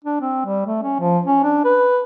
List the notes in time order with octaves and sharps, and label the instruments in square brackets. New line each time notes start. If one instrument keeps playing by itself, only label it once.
[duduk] D4
C4
G3
A3
C#4
F3
C#4
D4
B4